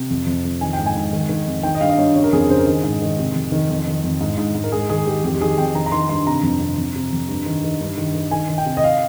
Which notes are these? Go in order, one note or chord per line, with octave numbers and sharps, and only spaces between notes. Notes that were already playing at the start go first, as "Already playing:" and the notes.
Already playing: C3
F2
F2
F2
D#3 G#5
G5
G#2
G#5
G#2
D#3
D#3
F2
D#3 G5
D#5
G2 F5
D#5
G2 C#5
C#3 C#5
A#4
F2 G#4
C#3 C5
A#4
D#3 G#4
G#2
D#3
C3
F2
D#3
F2
D#3
F2
G#2
G#2
G#2
A#4
G#2 G#4
D#3 G#4
D#3 G4
F2 G4
G4
D#3 G#4
F2 G5
D#3 A#5
A#5
D#3 C6
G2 C6
C3 A#5
F2
C3
F2
C3
F2
G2
D#3
D#3
G2
D#3
D#3
D#3 G#5
D#3
G5
C3
D#5
F5